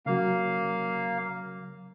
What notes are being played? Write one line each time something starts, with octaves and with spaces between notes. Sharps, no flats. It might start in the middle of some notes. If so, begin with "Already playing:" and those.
C#3 F#3 A#3 F5